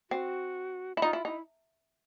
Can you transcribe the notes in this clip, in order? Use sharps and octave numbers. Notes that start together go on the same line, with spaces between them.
C4 F#4
E4
D#4 F4
E4
D#4 E4